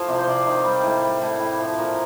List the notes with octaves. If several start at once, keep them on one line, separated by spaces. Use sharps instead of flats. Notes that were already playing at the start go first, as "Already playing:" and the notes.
Already playing: A2 F3 F5
C3 D5
C5
C3 D5
D#3
G3
A2
G3
A2
A2
F3
A#2 A#4